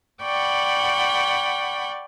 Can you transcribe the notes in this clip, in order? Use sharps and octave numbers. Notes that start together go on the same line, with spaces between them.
D5 F#5 G5 B5 C#6